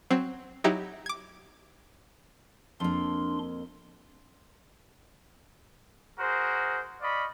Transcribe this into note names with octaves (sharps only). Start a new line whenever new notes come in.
F#3 C4
F#3 D#4 E4 G4
D6 G#6
F2 A#3 D4 C6
F#4 G#4 A#4 C5
D5 D#5 F5 B5 C#6